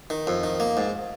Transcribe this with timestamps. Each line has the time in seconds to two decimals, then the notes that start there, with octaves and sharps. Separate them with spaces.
0.10 D#3
0.27 F2
0.43 D#3
0.60 A#3
0.77 G#2